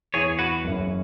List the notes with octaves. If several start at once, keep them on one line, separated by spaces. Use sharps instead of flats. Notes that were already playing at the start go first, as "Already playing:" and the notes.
E2 E3 B3 G#4 C#5
F#4 B4
F#1 F#2 E3 C#4 E4